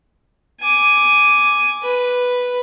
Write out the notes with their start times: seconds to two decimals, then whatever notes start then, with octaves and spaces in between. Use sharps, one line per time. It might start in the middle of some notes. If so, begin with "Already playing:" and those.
0.61 G#5 D6
1.83 B4